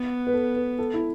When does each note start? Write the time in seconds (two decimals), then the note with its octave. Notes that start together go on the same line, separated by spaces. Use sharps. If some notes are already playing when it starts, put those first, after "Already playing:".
Already playing: B3
0.27 B4
0.34 A4
0.56 B4
0.79 A4
0.94 E4